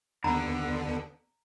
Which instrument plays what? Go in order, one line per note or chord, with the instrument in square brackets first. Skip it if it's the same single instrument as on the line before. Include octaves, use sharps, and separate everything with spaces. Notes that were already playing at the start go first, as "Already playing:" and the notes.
[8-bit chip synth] D#2 B3 [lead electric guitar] D3 [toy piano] A#5